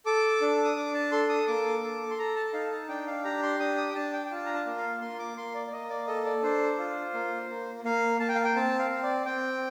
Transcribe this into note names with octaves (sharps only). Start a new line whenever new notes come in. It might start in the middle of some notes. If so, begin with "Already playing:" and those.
A4 D6
D4
D#6
D4 D6
A5
A4 C6
D#6
A#3 D6
A4
C6
A4 A#5
A5
D#4 F5
A5
D4 G5
F5
G4 A#5
C6
D4 D#6
D#6
G5
D4 A5
G5
G5
F4 A5
A#5
A5
A#3
F5
A#3 C6
D6
A#3 C6
D5
D5
A#3 D#5
D5
A4 D#5
D5
D4 C5
F4
A#3
A#3
A#3 F5
A#3 A5
G5
F5
G5
C4 A5
F5
C4
D5
C4 G5